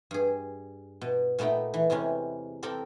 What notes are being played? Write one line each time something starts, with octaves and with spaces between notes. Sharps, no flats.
G2 G#4
B2
A#2 A3 B3 D#4 G5
E3
E2 C3 G#3 C#4
C4 A4 A#4 D5 G5